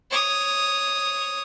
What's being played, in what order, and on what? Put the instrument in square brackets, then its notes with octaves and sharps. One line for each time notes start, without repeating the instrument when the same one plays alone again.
[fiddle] C#5 D#6